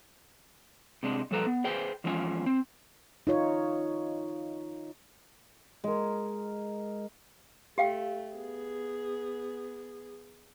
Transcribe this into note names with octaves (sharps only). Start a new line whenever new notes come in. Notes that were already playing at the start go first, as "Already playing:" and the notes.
C3 G#3 D4
G2 F3 A4 B4 A#5
B3
G#4 B4 C5 G5 G#5
E2 F3 G#3 C#4 F4 G#5
C4
D#4 F4 C#5
G#3 A#4
A3 G4 F5 G5
B3 G#4